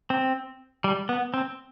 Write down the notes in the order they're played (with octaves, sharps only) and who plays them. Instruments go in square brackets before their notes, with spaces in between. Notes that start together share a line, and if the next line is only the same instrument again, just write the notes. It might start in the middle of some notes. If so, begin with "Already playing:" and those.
[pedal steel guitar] C4
G3
B3
C4